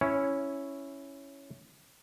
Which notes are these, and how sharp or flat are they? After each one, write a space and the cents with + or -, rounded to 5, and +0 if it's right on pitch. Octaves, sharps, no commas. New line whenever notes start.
C#4 +0 E4 +0 C#5 +0